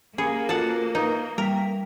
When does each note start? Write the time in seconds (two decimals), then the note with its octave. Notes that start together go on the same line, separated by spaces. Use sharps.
0.18 A#3 C#4 G#4 B5 C#7
0.49 F4 F#4 A4 F#5 A5
0.95 D#4 A#4 B4 A#5
1.38 G3 A#4 G5 B6